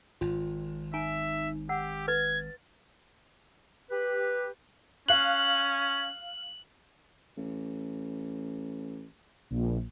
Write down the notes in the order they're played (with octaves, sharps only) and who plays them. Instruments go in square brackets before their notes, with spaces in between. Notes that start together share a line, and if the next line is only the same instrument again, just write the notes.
[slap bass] G#1 [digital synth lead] F4
[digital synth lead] D#4 [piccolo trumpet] E5 [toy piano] G#5
[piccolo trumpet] G4 [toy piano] F#5 [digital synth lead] E6
[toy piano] B4 [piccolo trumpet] G#6 [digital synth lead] A6
[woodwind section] G4 B4
[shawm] C#4 [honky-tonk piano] F5 F#6 [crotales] F#7
[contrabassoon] A1
[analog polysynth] A#1